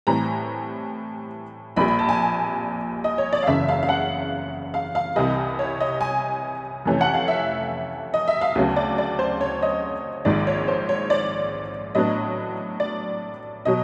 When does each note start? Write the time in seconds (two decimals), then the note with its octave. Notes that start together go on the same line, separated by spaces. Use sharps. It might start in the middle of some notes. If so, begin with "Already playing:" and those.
0.07 A2 E3 G3 C4 A#5
1.76 A#1 A#2 G3 B5
1.88 B5
1.99 A5
2.09 G#5
3.04 D#5
3.18 C#5
3.33 D5
3.43 F5
3.47 F#1 E2 C#3 E5
3.69 F5
3.83 F5
3.89 F#5
4.74 F5
4.95 F5
5.16 C2 C3 E3 G3 D#5
5.59 C#5
5.81 D#5
6.01 G#5
6.85 F2 C3 E3 A3 C#4
7.01 F#5
7.14 F5
7.28 E5
8.14 D#5
8.28 E5
8.41 F5
8.55 D2 C#3 F#3 B3
8.76 D5
8.98 D5
9.19 C5
9.41 C#5
9.62 D#5
10.25 A#1 G#2 D#3 D5
10.47 C#5
10.68 C5
10.89 C#5
11.10 D5
11.95 A2 F#3 B3 D4 D#5
12.80 D5
13.65 B2 F#3 D#5